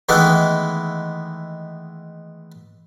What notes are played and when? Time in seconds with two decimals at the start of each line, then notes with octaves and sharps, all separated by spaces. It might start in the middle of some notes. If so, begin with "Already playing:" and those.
0.09 D#3 E3 G#3 A3 B3